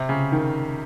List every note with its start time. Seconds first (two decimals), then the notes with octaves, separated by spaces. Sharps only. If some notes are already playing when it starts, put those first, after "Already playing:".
Already playing: C3
0.09 C#3
0.32 D#3